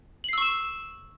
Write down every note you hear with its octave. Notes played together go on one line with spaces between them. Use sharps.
C#6 E6 C7 E7 F#7